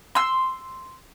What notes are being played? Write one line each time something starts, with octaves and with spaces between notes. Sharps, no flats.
C6 E6